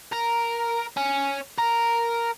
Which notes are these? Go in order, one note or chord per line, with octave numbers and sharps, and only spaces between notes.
A#4
C#4
A#4